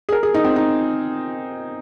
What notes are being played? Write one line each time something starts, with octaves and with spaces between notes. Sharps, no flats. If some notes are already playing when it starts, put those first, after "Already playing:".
G#4
A#4
G#4
D#4
C4
D#4